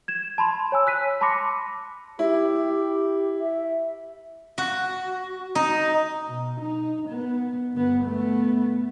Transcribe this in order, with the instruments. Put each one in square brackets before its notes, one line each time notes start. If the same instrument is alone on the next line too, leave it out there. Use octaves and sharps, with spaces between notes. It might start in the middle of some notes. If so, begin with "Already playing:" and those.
[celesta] G#6 E7
A5 B5 C6
C#5 G#5 E6
F#6 B6 D#7
A5 B5 C6 D6 A#6 C#7
[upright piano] E4 [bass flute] G4
[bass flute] E5
[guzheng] F#4
D#4
[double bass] B2
D#4
B3
G1 B3
A3 B3